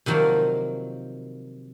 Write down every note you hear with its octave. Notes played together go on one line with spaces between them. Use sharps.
C3 D#3 F3 F#3 A#3